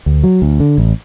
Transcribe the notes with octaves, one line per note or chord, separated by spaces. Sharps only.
D2
F#3
D2
D3
A1